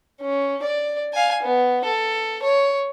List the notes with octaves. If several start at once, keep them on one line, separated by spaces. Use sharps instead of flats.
C#4
D5
F5 G#5
B3
A4
C#5